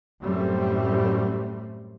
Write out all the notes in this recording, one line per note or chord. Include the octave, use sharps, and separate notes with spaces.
F#2 A2 G3 A3 C4